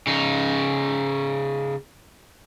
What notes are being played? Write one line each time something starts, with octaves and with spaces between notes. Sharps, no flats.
C#3 D#4